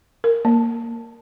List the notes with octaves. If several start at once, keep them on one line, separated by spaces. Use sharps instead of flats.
A#4
A#3